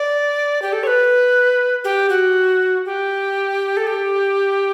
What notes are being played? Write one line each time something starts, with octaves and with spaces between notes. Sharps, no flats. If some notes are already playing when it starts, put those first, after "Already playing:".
Already playing: D5
G4
A4
C#5
B4
G4
F#4
G4
A4
G4